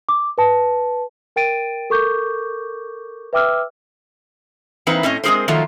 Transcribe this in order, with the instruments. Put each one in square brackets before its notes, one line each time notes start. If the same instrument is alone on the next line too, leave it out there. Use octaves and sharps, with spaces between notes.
[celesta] D6
B4 A5
A#4 G5 A6 D7 D#7
A4 A#4 C#6 D6 G6
B4 E5 G5 D6 E6 F6
[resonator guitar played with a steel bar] E3 A#3 C4 D#4 B4
A2 C4 C#4 D#5
G#3 C4 D#4 G#4 A#4 C5
D#3 F3 F#3 A3 A#3 F4